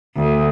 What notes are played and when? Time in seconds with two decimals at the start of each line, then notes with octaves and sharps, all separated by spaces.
0.14 D2